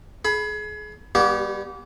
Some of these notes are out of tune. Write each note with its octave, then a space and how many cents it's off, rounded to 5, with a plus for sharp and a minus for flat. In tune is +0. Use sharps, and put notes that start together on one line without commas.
G#4 +30 B5 +0
G3 +20 B3 -35 G4 -30